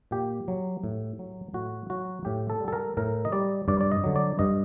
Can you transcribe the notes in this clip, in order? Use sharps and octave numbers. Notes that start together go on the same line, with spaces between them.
A#2 G4
F#3
A2
F#3
A2 F#4
F#3 F#4
A2 G4
A4
G3
A4
A#4
A2 A#4
D#5
G3 D5
G2 D5
D5
D#5
D3 F#3
D5
G2 D#5